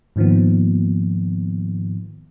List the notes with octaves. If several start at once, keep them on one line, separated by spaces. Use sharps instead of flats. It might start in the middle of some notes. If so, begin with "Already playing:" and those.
G#2 D#3 F3 A#3 B3